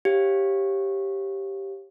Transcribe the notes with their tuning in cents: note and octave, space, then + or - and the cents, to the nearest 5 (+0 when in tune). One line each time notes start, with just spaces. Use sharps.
G4 +0 C#5 -30 F5 +0